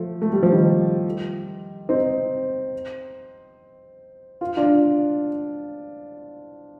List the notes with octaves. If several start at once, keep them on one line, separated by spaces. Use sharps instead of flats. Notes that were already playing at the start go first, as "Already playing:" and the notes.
Already playing: F3 A3
A3
G3
F3
D#3 G3
C4 D#4
F4
D4 F4